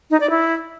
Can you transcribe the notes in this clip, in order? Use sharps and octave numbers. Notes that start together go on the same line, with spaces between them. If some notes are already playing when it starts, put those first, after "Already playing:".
D#4
D5
E4